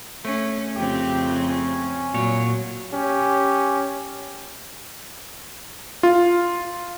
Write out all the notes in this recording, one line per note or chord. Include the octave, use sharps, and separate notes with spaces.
A3 C#4
F2 C#3 C4 G4
C#4
A#2 F#3 C#5
C#4 G4
F4